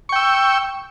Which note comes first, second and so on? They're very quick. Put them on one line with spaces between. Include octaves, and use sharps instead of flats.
C#6 G5 E6